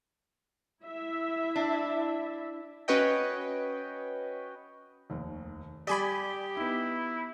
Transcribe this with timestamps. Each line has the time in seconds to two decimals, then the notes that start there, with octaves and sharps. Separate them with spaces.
0.83 E4 E5
1.56 D4
2.88 C#4 F#4 B4 C#5 D#5 G5
5.10 F1 D#2
5.87 G3 G4 D5 G#5 B5 D#6
6.57 B3 D#4 E4